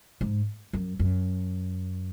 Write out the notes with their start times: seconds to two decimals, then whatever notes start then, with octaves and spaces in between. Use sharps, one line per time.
0.21 G#2
0.73 F#2
0.99 F#2